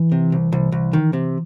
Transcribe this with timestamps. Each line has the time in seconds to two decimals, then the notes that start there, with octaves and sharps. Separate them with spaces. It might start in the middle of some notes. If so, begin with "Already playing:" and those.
Already playing: E3
0.12 C3
0.32 C2
0.53 C2
0.72 C2
0.93 D#3
1.13 C3